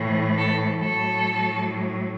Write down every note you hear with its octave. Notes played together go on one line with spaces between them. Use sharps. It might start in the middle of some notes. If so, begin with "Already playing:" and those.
Already playing: A2 E3
A4
A2 F#3 A4